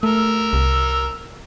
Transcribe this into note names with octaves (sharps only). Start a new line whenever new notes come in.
A3 A#4 E6
C2